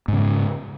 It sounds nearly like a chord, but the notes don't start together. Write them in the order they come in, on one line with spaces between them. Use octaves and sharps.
G#2 C#3 G#3